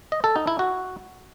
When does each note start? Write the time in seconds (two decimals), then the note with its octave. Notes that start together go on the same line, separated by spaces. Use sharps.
0.12 D#5
0.24 A4
0.36 D#4
0.47 E4
0.59 F#4